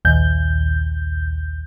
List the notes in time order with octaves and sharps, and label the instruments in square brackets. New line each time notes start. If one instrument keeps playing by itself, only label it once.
[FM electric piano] A#1 D#2 G6